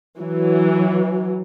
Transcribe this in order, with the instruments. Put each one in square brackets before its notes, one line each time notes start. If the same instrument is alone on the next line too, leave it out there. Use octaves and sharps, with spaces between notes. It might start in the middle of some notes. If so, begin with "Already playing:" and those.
[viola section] E3 F#3